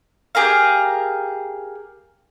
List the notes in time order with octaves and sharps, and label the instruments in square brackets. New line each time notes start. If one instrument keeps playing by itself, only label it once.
[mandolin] G4 G#4 A#4 F5